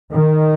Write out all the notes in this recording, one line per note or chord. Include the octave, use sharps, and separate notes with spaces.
D#3